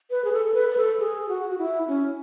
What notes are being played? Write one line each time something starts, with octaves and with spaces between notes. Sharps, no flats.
B4
G#4
A4
B4
B4
A4
G#4
G#4
F#4
F#4
E4
C#4